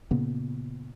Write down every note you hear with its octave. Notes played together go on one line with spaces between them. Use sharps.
A#2 C#3 A#3 B3